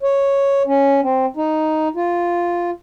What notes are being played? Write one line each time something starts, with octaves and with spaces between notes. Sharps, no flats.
C#5
C#4
C4
D#4
F4